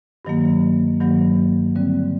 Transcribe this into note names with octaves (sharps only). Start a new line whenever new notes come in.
G2 D#3 F#3 A#3
G2 D#3 F#3 A#3
D3 G3 C4